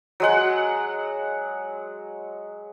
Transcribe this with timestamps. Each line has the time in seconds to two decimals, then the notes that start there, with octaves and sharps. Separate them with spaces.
0.20 F#3 G#3 F#5